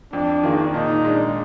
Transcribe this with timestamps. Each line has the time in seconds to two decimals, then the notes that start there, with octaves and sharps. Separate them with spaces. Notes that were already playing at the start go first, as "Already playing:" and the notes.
0.13 F2 D4
0.43 D#3 A#3 F4 G#4
0.74 A#2 D#4
1.04 G#3 D4